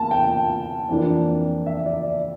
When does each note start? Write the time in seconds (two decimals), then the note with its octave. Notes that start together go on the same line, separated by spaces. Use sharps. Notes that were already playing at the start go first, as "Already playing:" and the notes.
Already playing: E2 A#3 A5
0.11 G5
0.89 F2 E3 A#3 D4
1.66 E5
1.86 D5